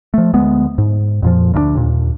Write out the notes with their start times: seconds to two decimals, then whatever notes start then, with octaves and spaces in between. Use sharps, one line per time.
0.14 F3 A3
0.33 D2 G#3 B3
0.78 G#2
1.22 F2 A#2 F3
1.54 D2 G2 D4
1.75 D#2 A#2